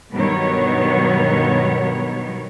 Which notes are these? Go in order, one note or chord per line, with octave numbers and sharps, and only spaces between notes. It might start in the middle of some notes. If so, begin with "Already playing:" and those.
G2 B2 D#3 F#3 B3 C#5